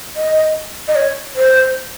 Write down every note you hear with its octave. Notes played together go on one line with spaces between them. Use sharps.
D#5
D#5
C#5
C5